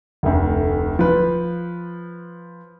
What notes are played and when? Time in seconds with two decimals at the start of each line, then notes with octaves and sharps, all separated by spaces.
0.23 F1 D2
0.99 F3 B4